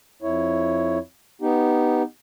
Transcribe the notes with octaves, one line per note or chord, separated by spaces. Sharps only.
F2 E4 C#5
B3 D#4 G4